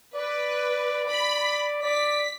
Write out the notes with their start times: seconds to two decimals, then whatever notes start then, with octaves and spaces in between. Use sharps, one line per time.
0.15 B4 D5
1.08 B5
1.83 D5 B6